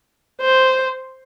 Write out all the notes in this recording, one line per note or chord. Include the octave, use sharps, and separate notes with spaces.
C5